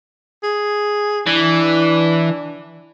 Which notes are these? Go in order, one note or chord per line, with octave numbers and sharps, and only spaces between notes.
G#4
E3 D4